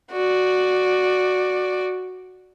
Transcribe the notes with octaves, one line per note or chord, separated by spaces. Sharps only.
F#4 D5